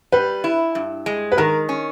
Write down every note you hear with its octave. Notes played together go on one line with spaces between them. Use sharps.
G3 B4
E4
G2
G#3
B4
D#3 A#4
C#4